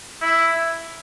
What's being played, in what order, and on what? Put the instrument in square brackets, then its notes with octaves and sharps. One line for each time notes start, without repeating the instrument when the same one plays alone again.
[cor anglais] E4